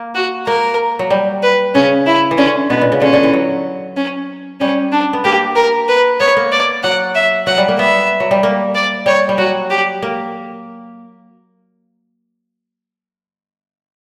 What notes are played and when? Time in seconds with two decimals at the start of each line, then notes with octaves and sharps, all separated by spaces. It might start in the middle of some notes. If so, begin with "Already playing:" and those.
Already playing: A#3
0.15 F#4
0.47 A#3 A#4
0.99 F#3
1.10 G3
1.43 B4
1.75 C#3 C#4
2.07 E4
2.31 E3
2.38 D3 C#4
2.70 B2 B3
2.81 A#2
2.92 C#3
3.02 D3 C#4
3.13 D3
3.23 E3
3.33 F#3
3.97 C#4
4.60 G3 C#4
4.92 D4
5.13 B3
5.25 A#3 G4
5.56 A#4
5.89 B4
6.20 B3 C#5
6.37 A#3
6.52 D5
6.83 F#3 F#5
7.15 E5
7.47 F#3 F#5
7.58 G3
7.68 A#3
7.79 B3 E5
8.20 F#3
8.31 G3
8.43 A#3
8.75 D5
9.06 G3 C#5
9.29 G3
9.38 F#3 F#4
9.70 G4
10.03 A#3